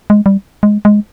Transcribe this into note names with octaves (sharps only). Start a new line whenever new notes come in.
G#3
G3
G#3
G#3